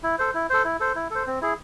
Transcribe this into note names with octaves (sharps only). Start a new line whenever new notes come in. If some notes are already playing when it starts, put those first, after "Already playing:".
E4
A4 C5
E4
A4 C5
E4
A4 C5
E4
A4 C5
C4
E4 G#4